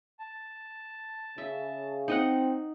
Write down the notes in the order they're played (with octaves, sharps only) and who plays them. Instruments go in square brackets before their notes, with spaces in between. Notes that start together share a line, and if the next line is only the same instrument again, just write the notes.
[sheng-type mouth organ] A5
[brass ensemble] C#3 [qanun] E5
[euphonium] C4 [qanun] D#4 D#5 F#5